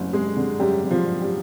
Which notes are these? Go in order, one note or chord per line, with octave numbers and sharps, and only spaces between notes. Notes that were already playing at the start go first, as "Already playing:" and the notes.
Already playing: F#1 F#2 A3
G3 G#3 G#4
D3
F#2 G3 G4
F#1
F3 F4
G3
G3 G4